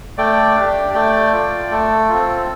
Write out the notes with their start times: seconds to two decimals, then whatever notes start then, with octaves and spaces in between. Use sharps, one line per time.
0.18 A3 D5 G5
0.56 D4 G4
0.94 A3 D5 G5
1.33 F4
1.71 A3 A4
2.09 C4 F4